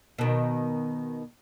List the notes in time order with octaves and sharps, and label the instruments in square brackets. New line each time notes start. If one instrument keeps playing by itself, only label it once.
[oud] B2 D#3